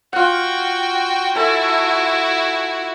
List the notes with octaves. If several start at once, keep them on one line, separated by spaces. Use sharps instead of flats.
F4 F#4 F#5 G5
E4 F#4 A4 G#5